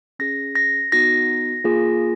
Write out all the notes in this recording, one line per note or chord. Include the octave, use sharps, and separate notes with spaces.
C#4 G#4 A#6
A#6
B3 D#4 F#4 A#6
A#3 F4 G#4